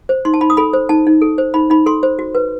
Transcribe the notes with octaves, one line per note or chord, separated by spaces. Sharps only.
C5
D#4 C6
A5
D#4 B5
D#6
A4 B5
C5
D#4 A5
D#4
A4
C5
D#4 B5
D#4 B5
A4 C6
C5
F#4
B4